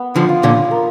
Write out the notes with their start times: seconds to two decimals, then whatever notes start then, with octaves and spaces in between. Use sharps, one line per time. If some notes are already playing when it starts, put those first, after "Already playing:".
Already playing: B3
0.16 D3 F3
0.29 F4
0.43 A#2 D3
0.71 A#4